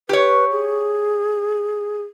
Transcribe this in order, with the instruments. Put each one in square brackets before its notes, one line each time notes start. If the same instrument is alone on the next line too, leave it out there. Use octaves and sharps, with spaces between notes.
[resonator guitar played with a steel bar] G4 C#5 [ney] B4
[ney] G#4